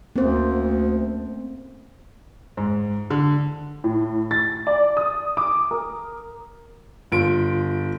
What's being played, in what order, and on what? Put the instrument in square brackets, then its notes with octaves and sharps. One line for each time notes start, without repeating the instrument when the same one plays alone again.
[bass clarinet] D2 [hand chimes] A3 C4 C#4 [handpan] A#3 C5
[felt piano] G#2
D3
[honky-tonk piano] A2
A6
D5
D#6
D6
A#4
[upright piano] G1 F4 D7